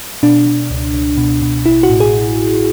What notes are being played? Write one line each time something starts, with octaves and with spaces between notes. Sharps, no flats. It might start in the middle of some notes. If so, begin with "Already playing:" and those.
B2 D4
B2
C#2
C#2
B2
B2
A1 E4
F#4
A2
G#4